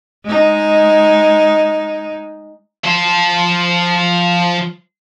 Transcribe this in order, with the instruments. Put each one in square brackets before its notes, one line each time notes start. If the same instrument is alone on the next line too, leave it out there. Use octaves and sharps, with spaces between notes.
[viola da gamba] G#3 D#4
[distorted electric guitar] F3 C5